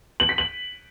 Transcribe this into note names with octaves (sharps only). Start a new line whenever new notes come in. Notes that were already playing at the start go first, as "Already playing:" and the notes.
F#7
B6
F#7